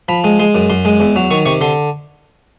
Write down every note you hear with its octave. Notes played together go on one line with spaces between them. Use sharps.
F3 B5
G#3
G#3 C6
F#2
F#2 C6
G#3
E2
F#3
D#3 C#6
C3 C#6
D3 C6